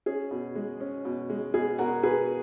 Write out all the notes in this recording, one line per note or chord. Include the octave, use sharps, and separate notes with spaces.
C#4 G#4
B2
G#3
C#4
B2
G#3
B2 G#4
B2 F#4 A#4
B2 G#4 B4